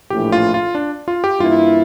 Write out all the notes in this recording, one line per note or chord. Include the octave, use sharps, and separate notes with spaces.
A#1 A2 E3 G4
F4
F4
D4
F4
G4
G2 E3 A#3 E4 F4